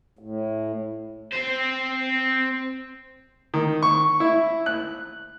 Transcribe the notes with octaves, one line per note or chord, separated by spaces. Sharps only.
A2
C4 C5
D#3
C#6
E4
F#6